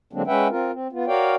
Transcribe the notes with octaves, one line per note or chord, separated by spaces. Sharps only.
D3 F#3 G#3 A#3 C4 D4
G#3 C#4 B4 E5 F#5 G5
C4 F4 A#4
C4
B3 F4
F#4 A#4 C#5 D5 F5 G5